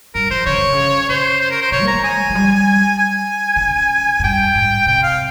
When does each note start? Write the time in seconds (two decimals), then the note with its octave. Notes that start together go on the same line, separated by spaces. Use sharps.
0.15 G2 A#4
0.30 F3 C5
0.46 C#3 C#5
0.59 C3
0.72 C#3
1.09 C#3 C5
1.41 C5
1.51 A#4
1.62 C5
1.72 C3 C#5
1.82 A#3
1.88 A#5
1.93 A#3
2.04 G#3 G#5
2.30 F3
2.35 G3
2.98 G#5
3.56 D#3
3.61 C#3
4.19 G#2
4.24 G2 G5
4.55 G#2
4.86 C3 G5
5.03 F5